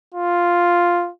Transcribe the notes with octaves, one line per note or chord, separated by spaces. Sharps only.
F4